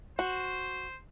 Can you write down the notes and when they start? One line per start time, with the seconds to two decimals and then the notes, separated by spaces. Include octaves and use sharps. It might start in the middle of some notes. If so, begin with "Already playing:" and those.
0.19 F#4 C5